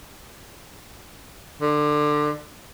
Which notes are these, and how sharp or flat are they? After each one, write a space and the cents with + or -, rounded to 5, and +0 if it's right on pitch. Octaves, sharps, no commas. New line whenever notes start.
D3 +20